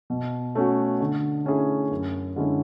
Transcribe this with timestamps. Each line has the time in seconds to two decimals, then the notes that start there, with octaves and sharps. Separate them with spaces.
0.10 B2
0.55 A3 C#4 F#4
1.00 D3
1.45 A3 C#4 E4 G#4
1.91 F#2
2.36 D3 G#3 C#4 E4